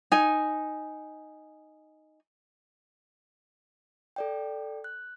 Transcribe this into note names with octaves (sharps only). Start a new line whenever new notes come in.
D#4 G#5
A4 D5 G5
F#6